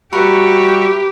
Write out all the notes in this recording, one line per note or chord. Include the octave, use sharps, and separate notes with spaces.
G3 F#4 G4 A#4 B4 E5 C#6